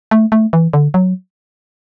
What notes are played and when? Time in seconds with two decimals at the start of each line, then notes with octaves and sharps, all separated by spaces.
0.11 A3
0.32 A3
0.53 E3
0.73 D3
0.94 F#3